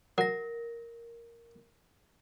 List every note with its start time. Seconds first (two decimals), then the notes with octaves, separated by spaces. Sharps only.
0.18 F#3 A#4 A#6